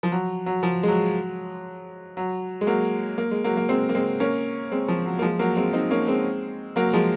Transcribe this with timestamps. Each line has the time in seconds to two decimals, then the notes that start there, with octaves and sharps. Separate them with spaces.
0.03 F3
0.12 F#3
0.46 F#3
0.63 F3
0.83 G#3
0.88 F#3
2.17 F#3
2.61 G#3
2.67 F#3 A#3
3.18 A#3
3.31 G#3
3.44 F#3 A#3
3.57 A#3
3.69 G#3 C4
3.89 A#3
3.95 G#3 C4
4.20 A#3 C#4
4.72 G#3 C4
4.88 F3
5.05 F#3
5.19 A#3
5.22 F3 G#3
5.39 F#3 A#3
5.57 G#3 C4
5.73 C4 D#4
5.91 A#3 C#4
6.08 G#3 C4
6.76 F#3 A#3
6.93 F3 G#3